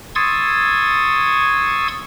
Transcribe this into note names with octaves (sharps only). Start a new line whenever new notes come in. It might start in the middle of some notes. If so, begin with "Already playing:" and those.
C6 C#6 D#6 E6 G#6 A6